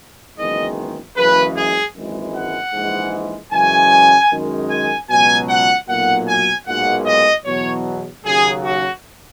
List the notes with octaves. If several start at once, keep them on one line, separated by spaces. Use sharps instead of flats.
F#1 E2 D#3 G#3 D#5
F#1 F#2 C#3 E3 G#3 B4
G#4
G#1 F#2 E3 G#3
F#5
A#1 G#2 E3 G#3
F#2 C#3 E3 G#3 G#5
F#2 D#3 G#3
G#5
C#2 B2 F#3 G#5
F#5
B1 A#2 F#3 F#5
G#5
B1 A#2 G#3 F#5
D#5
E2 B2 F#3 C#5
D#2 C#3 F#3 G#4
F#4